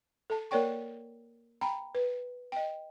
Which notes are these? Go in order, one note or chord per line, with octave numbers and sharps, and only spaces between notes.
A4 A5
A#3 A#4 C#5 D5 G5 C#6
G5 A#5 B5
B4
D#5 G5